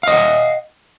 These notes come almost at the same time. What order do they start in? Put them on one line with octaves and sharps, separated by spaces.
F5 D#5 F#5